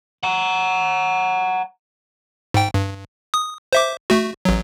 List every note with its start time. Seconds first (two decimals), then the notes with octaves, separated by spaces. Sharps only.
0.23 F#5 A#5
2.54 G#2 G5
2.74 G2
3.34 D#6
3.73 C5 E5 D6
4.10 A3 F#4
4.45 A1 F#3